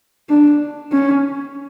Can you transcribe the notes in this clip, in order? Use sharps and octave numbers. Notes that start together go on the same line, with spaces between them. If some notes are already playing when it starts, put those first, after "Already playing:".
D4
C#4